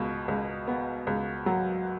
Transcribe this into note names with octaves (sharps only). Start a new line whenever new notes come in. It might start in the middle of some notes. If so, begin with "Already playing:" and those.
Already playing: C#2 B2
C#2
B3
C#2
F#3